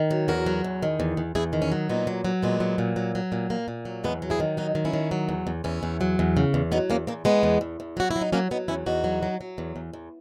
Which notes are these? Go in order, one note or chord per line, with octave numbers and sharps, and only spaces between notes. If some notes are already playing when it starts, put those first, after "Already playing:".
Already playing: D#3
F#3
E2 F#4 A#4
F#3
E2
D#3
E2
E2
E2 E4 G#4
D#3
C#4 E4
F#3
A#2 B3 D#4
F#3
F#3
A#2 G#3 B3
F#3
A#2
F#3
F#3
A#2
A#2 A#3
A#2
F#3
E2 G#3 B3
F#3
E4 G#4
D#3
F#3 D#4 F#4
D#3
C#4 E4
D#3
F#3
E2
E2
E2 C#4 E4
E2
F#3
E2
C#3
E2
F#3 B3 D#4
E2 A#3 C#4
E2 A#3
E2 G#3 B3
E2
E2
E2
F#3 F#4
E4
F#3
D#4
F#3 A#3 C#4
F#3 B3 D#4
E2 C#4 E4
E2 D#4 F#4
F#3
F#3
F#3
E2
E2
E2